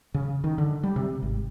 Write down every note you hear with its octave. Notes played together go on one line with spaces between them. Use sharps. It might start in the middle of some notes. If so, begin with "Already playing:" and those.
C#3
D#3
D3
G3
C3
G#1